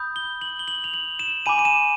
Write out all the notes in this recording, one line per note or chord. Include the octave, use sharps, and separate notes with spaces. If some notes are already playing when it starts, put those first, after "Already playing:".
Already playing: B5 D#6 G6
G7
F#7
G7
F#7
F7
F#7
E7
G#5 B5 D6 D#7
D#7
E7